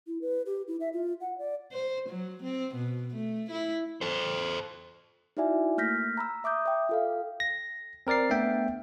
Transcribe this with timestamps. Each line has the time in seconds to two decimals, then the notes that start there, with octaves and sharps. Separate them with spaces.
0.07 E4
0.22 B4
0.46 G4
0.68 E4
0.80 E5
0.93 F4
1.21 F#5
1.38 D5
1.73 C5
2.10 F#3
2.43 C4
2.75 B2
3.15 A3
3.51 E4
4.01 A4 C5
5.37 D#4 E4 F#4 D5 E5 G#5
5.78 A3 A#3 F6 G6 A#6 B6
6.17 A#5 B5 E6
6.44 E5 D6 D#6 G6
6.66 E5 G5
6.89 F4 A4 F5
7.40 A#6
8.07 C4 A#4 D5 A6 C7
8.30 A3 B3 D4 E5 G5